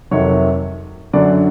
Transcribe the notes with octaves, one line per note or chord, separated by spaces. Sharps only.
F2 C3 D#3 F#3 C#5
F#2 D3 F#3 D5